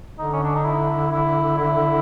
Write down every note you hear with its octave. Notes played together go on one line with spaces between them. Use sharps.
D3 D#4
C#4
D4
D#4
E4
E4
E4